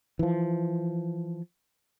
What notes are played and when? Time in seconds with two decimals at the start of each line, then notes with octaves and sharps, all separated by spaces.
0.19 E3 F3